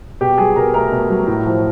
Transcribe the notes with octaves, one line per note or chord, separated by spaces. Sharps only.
B2 G4 G5
F#3 G#4 G#5
B2 A#4 A#5
A3 A#4 A#5
B2
F#3
A2
F3